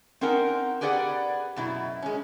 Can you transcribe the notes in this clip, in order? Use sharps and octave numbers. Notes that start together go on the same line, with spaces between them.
C4 C#4 D#4 A#4 F#5
G4 G#4 B4 D5 F5 F#5
F#2 B2 E4
G#3 C#4